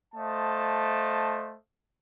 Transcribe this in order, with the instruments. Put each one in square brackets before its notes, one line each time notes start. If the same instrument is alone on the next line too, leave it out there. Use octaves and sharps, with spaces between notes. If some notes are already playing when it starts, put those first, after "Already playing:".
[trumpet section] A3 C5 D#5 F5 A5